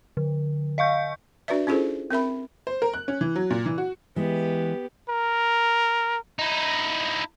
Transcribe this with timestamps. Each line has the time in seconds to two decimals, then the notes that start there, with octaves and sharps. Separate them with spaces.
0.17 D3
0.78 D#5 F5 C#6 G6
1.48 D4 F#4 B4 D5 E5
1.67 C#4 E4 F4 G#4 A4 C5
2.11 C4 A#4 E5 B5
2.67 C5
2.82 A#4
2.94 F#6
3.08 C#4
3.21 E3
3.36 F#3
3.50 A#2
3.66 E3
3.78 F#4
4.16 E3 G#3 B3 G4
5.10 A#4
6.39 D#4 E4